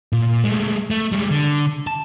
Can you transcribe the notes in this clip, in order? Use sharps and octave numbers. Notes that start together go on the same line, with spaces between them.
A#2
G#3 A3
A3
G3 G#3
D3
A5